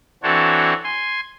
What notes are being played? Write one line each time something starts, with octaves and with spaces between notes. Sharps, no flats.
E3 C4 D4 F#4 A4 C#5
G#5 C6